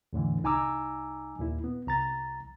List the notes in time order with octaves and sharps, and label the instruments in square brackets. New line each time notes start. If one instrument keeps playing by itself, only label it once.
[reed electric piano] E2 A2 D3 E3
C2 D#4 G#5 A#5 D6 E6
D#2 A#2 E4
B3
C2 A#5 A6